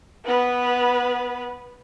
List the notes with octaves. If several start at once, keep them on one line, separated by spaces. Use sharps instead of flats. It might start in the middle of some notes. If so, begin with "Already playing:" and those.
B3 B4